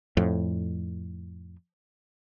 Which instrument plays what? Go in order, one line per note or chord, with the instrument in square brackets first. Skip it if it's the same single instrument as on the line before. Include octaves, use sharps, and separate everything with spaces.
[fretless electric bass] F2 A2